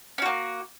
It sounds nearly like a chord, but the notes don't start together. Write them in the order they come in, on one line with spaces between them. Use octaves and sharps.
C#4 F#4 A#3